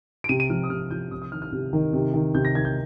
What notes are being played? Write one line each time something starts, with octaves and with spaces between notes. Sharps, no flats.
D7
C3 D#7
D#7
F3 F6
D#6
C3 F6
F3 G6
C3 D#6
D#6
D#3 F6
F6
C3
D#3
C3
D#3
C3 G6
A#6
D#3 G#6
G6